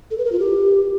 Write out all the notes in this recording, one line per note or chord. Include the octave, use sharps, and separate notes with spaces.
A4
B4
A#4
F4
G4